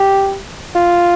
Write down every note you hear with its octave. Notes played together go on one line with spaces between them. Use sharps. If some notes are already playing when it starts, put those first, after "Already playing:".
Already playing: G4
F4